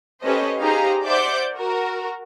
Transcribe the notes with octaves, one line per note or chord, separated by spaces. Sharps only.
C#4 G4 A4 B4 C5 D#5
D#4 G4 G#4 C5 F5 A#5
C5 D5 E5 F#5 D6 G6
F#4 A#4